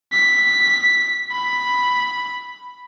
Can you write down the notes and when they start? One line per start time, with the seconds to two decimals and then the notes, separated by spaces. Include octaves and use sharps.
0.13 B6
1.32 B5